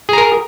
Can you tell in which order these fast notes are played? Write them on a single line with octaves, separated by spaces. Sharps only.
G#4 A#5 A#4